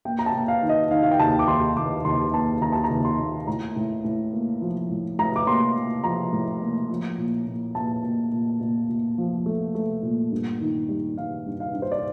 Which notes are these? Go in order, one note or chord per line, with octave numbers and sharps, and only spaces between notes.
A#3 G5
A#5
A5
A#3
F5
D#3
D#5
D#3 F5
F5
G5
D#2 A5
D6
D#2 C6
D#2 D6
D#2 C6
A#3 A5
D#2 A#5
A5
A#5
D#2
C6
A#3
A2 A#5
A2
A2
A#3
F3
A2
A2 A#5
D6
A#3 C6
A#3
F3 A#5
A2
A#3
F3
A#2
A#2
A#2 A5
A#2
A#2
A#2
A#2
F3
A3
A3
A#2
G2
D#3
G3
D#3 F5
G2
F5
G2
C5
D5